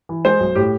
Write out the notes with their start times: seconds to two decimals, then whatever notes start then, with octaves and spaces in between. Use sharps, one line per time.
0.09 E3
0.25 G#3 C5
0.40 B1
0.55 A2 G4